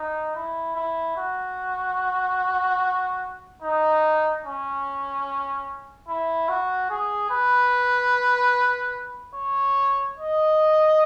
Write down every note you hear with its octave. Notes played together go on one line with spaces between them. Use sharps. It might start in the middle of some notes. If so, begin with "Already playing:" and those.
Already playing: D#4
E4
E4
F#4
D#4
C#4
E4
F#4
G#4
B4
C#5
D#5